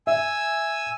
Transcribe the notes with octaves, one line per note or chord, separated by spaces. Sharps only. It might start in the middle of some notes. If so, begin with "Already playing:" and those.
E5 G#5 E6